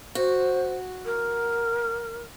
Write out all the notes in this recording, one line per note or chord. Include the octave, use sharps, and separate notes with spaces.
F#4 C5
A#4